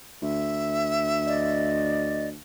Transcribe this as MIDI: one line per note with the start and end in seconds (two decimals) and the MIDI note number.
0.22 2.37 38
0.22 1.71 76
1.26 2.28 74
1.26 2.28 75